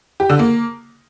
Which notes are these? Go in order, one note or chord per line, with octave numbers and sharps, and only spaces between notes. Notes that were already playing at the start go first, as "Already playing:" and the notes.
G4
D3
A#3